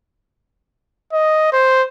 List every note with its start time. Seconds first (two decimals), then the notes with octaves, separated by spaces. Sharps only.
1.13 D#5
1.53 C5